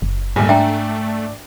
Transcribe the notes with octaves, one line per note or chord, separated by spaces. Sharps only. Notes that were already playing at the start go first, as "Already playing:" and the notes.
F#1
A#1 D#2 G#2 G3 A3 G#5
D4 E5 G5 A#5